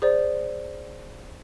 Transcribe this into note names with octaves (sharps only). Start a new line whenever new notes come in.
G#4 C5 D5